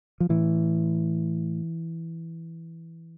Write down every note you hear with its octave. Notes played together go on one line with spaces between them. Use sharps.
F3
A2 E3